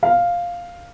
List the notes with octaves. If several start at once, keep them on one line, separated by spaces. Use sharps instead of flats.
F5